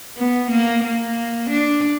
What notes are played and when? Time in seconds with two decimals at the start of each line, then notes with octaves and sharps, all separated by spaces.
0.18 B3
0.51 A#3
0.83 A#3
1.50 D4